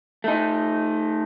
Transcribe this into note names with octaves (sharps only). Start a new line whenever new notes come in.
A3 D#4